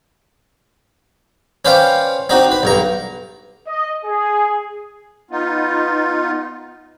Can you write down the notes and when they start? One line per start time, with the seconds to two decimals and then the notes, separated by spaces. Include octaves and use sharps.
1.65 C#4 B4 C5 D5 F5 G5
2.30 C4 D4 D#4 F#4
2.52 B4
2.63 B1 G2 A#5
3.67 D#5
4.04 G#4
5.31 B3 D#4 F4